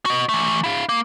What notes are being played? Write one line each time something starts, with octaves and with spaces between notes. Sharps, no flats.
F#4 D#5
E3 A3
E4 F5
A#3